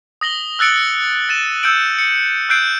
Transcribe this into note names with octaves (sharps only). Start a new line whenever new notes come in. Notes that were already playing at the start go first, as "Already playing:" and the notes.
D#6 A#6 F#7 G7
E6 F#6 A6 C#7 D7
A6 D#7 E7
E6 G6 C#7 D7 F#7
C#7
E6 F#6 G6 C7 D7